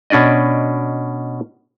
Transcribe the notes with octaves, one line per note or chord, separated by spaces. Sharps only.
B2 C#4 D4 D5 D#5